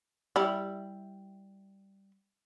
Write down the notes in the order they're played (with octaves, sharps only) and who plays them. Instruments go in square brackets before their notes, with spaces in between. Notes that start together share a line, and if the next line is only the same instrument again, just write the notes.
[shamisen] G3 E4